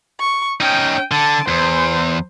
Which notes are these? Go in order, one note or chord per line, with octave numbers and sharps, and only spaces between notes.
C#6
C#4 D#4 G5
D3 A5
E2 C5